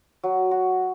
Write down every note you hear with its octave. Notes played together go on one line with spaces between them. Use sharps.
F#3
F#4